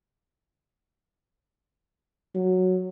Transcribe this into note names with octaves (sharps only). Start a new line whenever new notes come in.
F#3